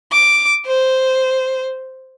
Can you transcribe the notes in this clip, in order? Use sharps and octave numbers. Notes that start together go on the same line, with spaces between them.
D6
C5